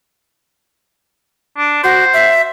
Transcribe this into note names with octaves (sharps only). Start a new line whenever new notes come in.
D4
F#4 C5
E5